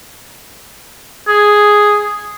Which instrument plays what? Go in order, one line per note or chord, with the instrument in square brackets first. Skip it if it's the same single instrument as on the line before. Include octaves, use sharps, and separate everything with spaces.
[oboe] G#4